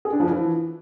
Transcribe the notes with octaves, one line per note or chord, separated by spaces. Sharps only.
G#4
D4
F3
E3